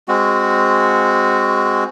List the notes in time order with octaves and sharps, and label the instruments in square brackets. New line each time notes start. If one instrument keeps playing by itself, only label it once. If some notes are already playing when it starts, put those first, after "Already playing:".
[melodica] G#3 C4 F#4